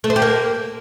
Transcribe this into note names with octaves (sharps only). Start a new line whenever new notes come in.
A3
C5
G4
A#3